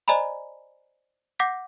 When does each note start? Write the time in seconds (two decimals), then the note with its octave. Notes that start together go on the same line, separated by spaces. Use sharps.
0.08 C5 D5 D#5 G#5 A#5 B5
1.40 F#5 D6 G6 A#6 B6